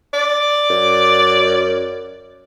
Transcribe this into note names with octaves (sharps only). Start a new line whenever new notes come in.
D5
F#2